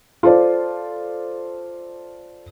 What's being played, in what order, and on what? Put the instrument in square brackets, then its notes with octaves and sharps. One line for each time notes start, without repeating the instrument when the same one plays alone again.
[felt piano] F4 A4 C5 D5